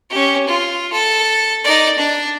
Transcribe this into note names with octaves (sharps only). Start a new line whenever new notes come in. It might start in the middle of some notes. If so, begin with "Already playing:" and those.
C#4 G4
F4
A4
D#4 D5
D4